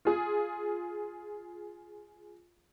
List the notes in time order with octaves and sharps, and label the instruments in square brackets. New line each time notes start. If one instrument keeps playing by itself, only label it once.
[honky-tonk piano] F4 G#4